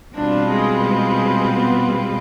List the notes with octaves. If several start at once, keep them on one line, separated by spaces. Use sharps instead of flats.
B2 G3 C4 D4 F4 B4
G#3
G#3
B3
G#3